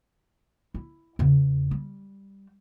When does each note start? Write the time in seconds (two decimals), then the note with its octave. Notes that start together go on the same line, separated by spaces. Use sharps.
0.74 E4
1.19 E2 C#3
1.71 G3